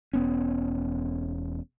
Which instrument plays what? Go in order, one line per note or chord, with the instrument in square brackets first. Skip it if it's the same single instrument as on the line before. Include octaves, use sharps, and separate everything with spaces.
[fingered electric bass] E1 B3 C#4